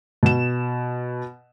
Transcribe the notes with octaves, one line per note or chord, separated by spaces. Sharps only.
B2 E7